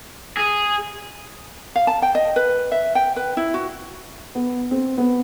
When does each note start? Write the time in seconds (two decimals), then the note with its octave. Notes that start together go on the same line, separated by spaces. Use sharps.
0.37 G#4
1.76 F5
1.87 A5
2.02 G5
2.15 D#5
2.36 B4
2.72 E5
2.95 G5
3.16 B4
3.37 E4
3.54 F#4
4.35 B3
4.71 C4
4.98 B3